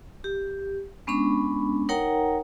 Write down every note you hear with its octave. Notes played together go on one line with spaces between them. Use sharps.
G4
G#3 B3 C#4 D4 B5 C#6
D#4 A#4 C#5 F#5 G5 A#5